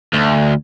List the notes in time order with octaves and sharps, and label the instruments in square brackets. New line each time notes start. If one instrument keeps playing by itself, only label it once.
[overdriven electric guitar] D2